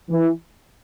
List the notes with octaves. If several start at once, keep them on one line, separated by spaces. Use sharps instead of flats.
E3